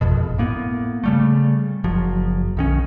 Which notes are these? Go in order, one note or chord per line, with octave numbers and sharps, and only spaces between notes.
D#1 G#1 F2 B2
A2 A#3 B3
C#3 G3 A3
F#1 F3 F#3
B1 D#3 C#4